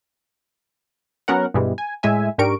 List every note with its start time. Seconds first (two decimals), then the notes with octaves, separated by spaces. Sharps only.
1.28 F#3 B3 C#4 A#4 F#5
1.54 G2 B2 E3 G3 G#3
1.78 G#5
2.03 A2 G#3 E5 G#5
2.38 G#2 D4 G4 A#4 C#6 D7